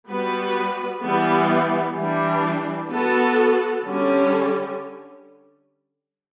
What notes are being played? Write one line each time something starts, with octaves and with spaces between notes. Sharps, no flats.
G3 B3 F#4 B4
E3 G3 B3
E3 G3 D4
B3 F#4 A4
D3 G3 C#4